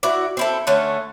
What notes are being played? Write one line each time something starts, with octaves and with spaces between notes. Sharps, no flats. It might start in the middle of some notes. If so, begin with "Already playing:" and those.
E4 F#4 D5
C4 E4 A4
D3 A3 C#4